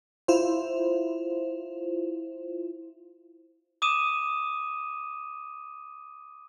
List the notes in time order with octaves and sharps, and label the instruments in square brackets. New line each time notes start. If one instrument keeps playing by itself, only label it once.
[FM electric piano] E4 F4 C5
[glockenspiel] D6 D#6 D#7 E7